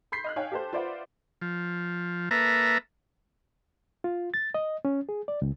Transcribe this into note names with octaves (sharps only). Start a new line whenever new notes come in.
B5 C6 G6 B6 C7
D#5 F6 F#6
D#4 C#5 F5 G5 G#5
G4 A4 C5
F4 B4 C5 D5 E5 F#5
F3
A#3 A4 B4 E5 A#5
F4
A6
D#5
C#4
G#4
D5
C#2